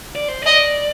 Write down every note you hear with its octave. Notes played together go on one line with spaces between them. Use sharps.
D5
C5
D5 D#5